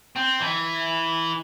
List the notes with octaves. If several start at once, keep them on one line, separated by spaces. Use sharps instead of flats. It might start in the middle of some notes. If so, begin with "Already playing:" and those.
C4
E3